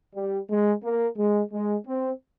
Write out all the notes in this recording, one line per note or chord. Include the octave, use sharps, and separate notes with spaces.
G3
G#3
A#3
G#3
G#3
C4